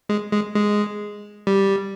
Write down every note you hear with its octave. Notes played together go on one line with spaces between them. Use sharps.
G#3
G#3
G#3
G3